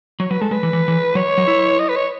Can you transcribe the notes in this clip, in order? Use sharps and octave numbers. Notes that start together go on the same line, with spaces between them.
F#3 C#5
F#3 B4
G#3 A4
G#3 B4
E3
E3
E3
F#3 C#5
F#3
E4
D#5
B4
C#5